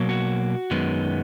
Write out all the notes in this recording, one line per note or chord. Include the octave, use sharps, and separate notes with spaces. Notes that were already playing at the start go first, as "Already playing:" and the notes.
Already playing: B2 F#3 A#3
F#4
F#2 D#3 G#3 B3